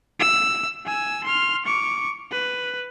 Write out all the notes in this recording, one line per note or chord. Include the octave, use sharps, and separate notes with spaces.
E6
G#5 E6
C6 F6
C#6 D6
B4